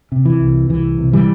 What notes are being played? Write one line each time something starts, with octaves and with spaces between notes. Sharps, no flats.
C3
E3
C2
C2 E3
C3
E3 G3